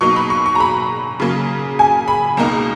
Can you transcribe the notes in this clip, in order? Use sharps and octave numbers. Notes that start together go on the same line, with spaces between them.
B2 F#3 A#3 D#4 C#6
B5
C#6
C#6
A#5
B5
C#3 F#3 A#3
G#5
B5
C#2 B2 A#3 D#4 A#5